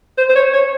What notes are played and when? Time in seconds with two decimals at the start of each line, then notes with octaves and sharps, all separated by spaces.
0.18 C5
0.29 C5
0.35 C#5
0.53 C#5